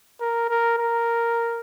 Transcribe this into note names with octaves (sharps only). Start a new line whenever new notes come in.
A#4
A#4
A#4